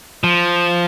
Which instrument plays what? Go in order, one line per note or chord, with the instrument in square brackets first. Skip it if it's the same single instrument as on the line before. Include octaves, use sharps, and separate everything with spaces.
[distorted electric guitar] F3